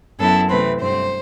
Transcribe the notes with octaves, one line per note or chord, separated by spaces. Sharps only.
F#2 F#3 B3 E4 A4
C3 E3 A3 C4 B4
G2 F#3 A3 C4 C5